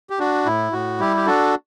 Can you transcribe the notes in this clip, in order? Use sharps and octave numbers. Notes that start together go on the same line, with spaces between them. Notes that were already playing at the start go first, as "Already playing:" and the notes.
G4
D4 F#4
A2 E4
A2 F#4
G3 E4 G4
G4
D4 F#4 A4